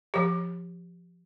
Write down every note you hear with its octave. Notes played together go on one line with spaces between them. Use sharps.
F3 G4